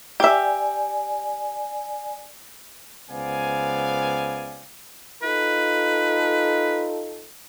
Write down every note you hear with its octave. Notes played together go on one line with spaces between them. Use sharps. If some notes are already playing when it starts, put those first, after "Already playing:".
G4 D5 E5 G#5
C#2 B3 C5 D5 F5 G#5
D#4 F4 A4 B4